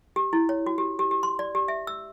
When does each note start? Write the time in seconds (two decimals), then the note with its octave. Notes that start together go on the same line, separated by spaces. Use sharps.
0.16 G4
0.33 E4
0.49 C#5
0.66 F#4
0.78 G4
0.99 G4
1.11 G4
1.23 C6
1.39 D5
1.55 G4
1.68 E5
1.87 E6